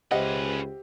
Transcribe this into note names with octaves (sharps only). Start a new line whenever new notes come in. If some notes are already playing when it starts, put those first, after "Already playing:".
C#2 C#4 G4 B4 C5 D#5 E5 F#5